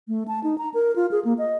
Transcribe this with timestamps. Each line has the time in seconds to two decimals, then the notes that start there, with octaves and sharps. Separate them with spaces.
0.08 A3
0.28 A5
0.44 D#4
0.58 A#5
0.74 A#4
0.96 F4
1.11 G#4
1.25 A#3
1.38 D#5